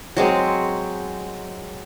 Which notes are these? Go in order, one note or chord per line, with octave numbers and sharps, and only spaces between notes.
F#3 G#3 C4